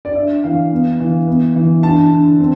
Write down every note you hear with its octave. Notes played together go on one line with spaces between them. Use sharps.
D5
D4 E5
E3 F5
B3
E3
B3
E3
D4 A5
D3
C4